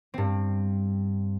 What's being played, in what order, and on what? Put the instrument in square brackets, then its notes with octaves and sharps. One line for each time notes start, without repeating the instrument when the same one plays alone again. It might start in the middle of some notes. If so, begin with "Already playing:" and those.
[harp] G2 C4